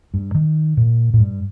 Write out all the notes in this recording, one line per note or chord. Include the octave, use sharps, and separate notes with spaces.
G2
D#3
A#2
A2
G2